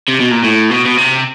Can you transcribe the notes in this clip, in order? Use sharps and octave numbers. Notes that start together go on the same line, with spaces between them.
C3
B2
A#2
A2
B2
B2
C3